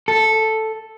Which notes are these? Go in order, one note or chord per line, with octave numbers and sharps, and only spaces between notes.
A4